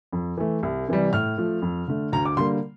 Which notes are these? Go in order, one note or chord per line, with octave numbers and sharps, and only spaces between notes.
F2
E3 A3
C2
C3 E3 G3
A2 F6
F3 A3
F2
D3 A3
D2 A#5
D6
D3 G3 A#3 C6